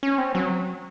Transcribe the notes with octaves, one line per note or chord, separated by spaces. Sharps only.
C#4
C4
F#3